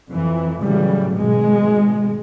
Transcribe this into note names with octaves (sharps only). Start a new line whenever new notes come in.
F2 E3
A2 C#3 E3 F#3 G3
G#1 B2 G#3